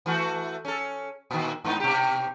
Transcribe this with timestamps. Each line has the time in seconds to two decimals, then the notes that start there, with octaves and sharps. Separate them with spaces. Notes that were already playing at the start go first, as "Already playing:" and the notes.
0.06 E3 A3 F#4
0.65 C#4 A4
1.31 A#2 D#3
1.64 G#2 B3 D#4
1.80 B2 G4